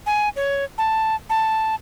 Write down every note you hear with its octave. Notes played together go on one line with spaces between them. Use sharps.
G#5
C#5
A5
A5